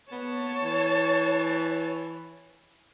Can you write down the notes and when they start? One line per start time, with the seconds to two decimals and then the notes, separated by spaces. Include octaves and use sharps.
0.12 B3 C#5 A5
0.62 E3